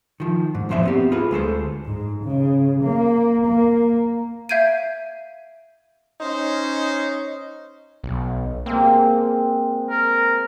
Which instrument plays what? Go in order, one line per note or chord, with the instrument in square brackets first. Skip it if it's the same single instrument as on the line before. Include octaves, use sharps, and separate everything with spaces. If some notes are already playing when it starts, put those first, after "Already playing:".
[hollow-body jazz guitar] D#3 F3
G#2
E2 A#2 F3 C5 E5
B3 C4 G4
F4 G#4 B4
D2 G#3 A4 C5
[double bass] G#2
C#3
A#3
A#3
[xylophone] E5 F5 G6 G#6 D7 D#7
[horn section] C#4 D#4 C5
[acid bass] B1
[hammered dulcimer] G#3 C4 [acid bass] A#3
[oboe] A#4